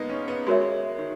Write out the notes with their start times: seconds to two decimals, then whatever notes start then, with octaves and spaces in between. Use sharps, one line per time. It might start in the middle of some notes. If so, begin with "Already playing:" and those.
Already playing: G#3 A#3 B3 D#4
0.09 C#4
0.28 B3
0.47 G#3 F#4 A#4 C#5 E5
0.98 D#3